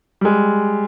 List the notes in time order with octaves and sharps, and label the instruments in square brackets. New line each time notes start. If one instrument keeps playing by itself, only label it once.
[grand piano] G3 G#3